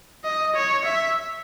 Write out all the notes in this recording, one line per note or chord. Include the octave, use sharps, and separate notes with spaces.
D#5
C#5
E5